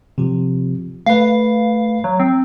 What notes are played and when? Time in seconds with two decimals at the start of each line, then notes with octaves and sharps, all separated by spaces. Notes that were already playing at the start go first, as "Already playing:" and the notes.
0.18 C3 F3
1.06 A3 B4 F5
2.04 F#3
2.20 C4